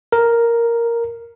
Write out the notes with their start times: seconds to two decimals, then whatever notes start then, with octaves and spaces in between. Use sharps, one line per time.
0.12 A#4